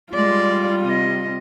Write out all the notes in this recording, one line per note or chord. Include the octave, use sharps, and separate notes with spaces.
G3 G#3 F4 D5
C3 D#5